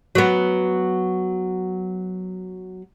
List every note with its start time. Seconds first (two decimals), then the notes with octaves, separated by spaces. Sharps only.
0.15 F#3 B3